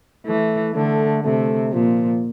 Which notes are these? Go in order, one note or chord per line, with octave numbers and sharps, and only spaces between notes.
E3 A3
D3 A3
C3 A3
A#2 F3